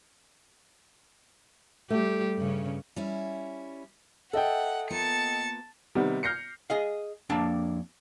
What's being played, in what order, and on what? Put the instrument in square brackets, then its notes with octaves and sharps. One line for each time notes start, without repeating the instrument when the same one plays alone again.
[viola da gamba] G3 G4 [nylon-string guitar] A3
[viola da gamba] G2 C#3 C#4
[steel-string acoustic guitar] G3 C#4 E4
[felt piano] A4 D#5 G5 [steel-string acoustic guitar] E5 [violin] F#5
[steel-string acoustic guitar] A#3 B3 F4 [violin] A5 C#7
[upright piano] C3 D#3 G3 B3
F6 G6 A#6 C7 C#7
[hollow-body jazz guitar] G#4 D#5 F5
F2 A#3 D4 A5